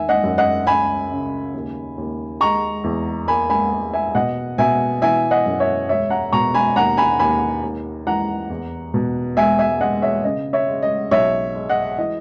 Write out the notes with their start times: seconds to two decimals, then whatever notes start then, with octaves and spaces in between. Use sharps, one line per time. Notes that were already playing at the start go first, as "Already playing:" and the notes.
Already playing: E2 D#3 E5 G#5
0.09 D#5 F#5
0.23 F#2
0.38 D#5 F#5
0.67 C#2 G#5 B5
1.10 C#3
1.54 D#2
1.98 D#2
2.41 G#3 A#5 C#6
2.84 E2
3.28 A#3 G#5 B5
3.50 G#5 B5
3.72 A#3
3.93 E5 G#5
4.15 B2 D#5 F#5
4.58 B2 E5 G#5
5.02 E3 E5 G#5
5.31 D#5 F#5
5.46 F#2
5.60 C#5 E5
5.89 E1 C#5 E5
6.10 F#5 A#5
6.32 B2 A#5 C#6
6.54 G#5 B5
6.76 D#2 F#5 A#5
6.97 G#5 B5
7.19 D#2 G#5 B5
7.63 D#2
8.07 E3 F#5 A#5
8.50 E2
8.94 B2
9.37 E1 E5 G#5
9.59 E5 G#5
9.81 G#3 D#5 F#5
10.02 C#5 E5
10.24 C#3 D#5
10.53 C#5 E5
10.68 G#3
10.83 D#5
11.11 B1 C#5 E5
11.55 G#3
11.69 D#5 F#5
11.98 E3 D#5